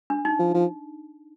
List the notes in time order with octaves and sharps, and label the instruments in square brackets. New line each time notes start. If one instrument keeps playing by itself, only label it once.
[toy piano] D4
D#4
[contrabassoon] F3
F3